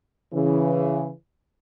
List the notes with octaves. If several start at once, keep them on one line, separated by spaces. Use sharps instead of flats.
C#3 E3